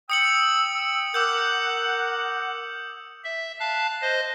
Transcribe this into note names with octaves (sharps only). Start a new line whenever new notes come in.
G5 D#6 E6 C#7 F#7
A#4 F#5 D6 E6 G6
E5
F5 A5 F#6
C5 D#5